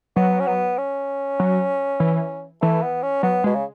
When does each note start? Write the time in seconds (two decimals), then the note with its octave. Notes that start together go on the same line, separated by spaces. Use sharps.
0.16 F#3 B3
0.40 C#4
0.47 B3
0.78 C#4
1.40 F#3
2.00 E3
2.62 E3 A3
2.82 B3
3.03 C#4
3.23 F#3 B3
3.44 B2 G#3
3.55 C#3